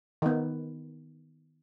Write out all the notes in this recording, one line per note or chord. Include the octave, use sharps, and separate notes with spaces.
D#3 B3